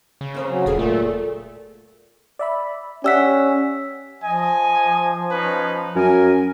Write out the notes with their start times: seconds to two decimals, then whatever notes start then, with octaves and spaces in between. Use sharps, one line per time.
0.21 C#3
0.34 A#3 C4 A#4
0.49 F#3
0.66 E1 A#2 G#4 A4 G5
0.79 A3
2.39 D5 E5 B5
3.04 C#4 G4 D5 E5 F#5 E6 B6
4.24 F3 D#5 G#5
5.31 C#4 D#4 B4
5.96 F#2 A#4 G#5